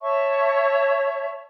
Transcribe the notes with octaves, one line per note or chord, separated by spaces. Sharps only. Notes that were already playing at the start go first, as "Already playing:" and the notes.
C#5 E5 A5 C#6